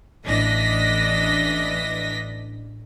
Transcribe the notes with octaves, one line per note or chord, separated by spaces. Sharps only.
A1 E3 D4 D#5 A#6 B6